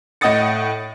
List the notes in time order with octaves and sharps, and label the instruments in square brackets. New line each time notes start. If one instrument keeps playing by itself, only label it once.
[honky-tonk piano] A2 D#5 F#5 D#6 A6 C#7